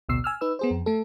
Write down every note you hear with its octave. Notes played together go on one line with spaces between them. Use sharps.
A1 D2 B2 E6 C7
G#5 E6 F6
D#4 B4 E6
B3 G#4 C5
F2
A3 A4